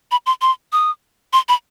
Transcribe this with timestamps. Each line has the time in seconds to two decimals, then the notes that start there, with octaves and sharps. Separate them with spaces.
0.11 B5
0.26 C6
0.42 C6
0.73 D#6
1.33 C6
1.49 B5